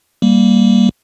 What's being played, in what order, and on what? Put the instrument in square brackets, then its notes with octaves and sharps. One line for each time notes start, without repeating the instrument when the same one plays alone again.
[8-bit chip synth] G3 A#3